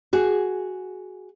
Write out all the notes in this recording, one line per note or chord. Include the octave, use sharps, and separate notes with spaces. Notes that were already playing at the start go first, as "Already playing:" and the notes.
F#4 G#4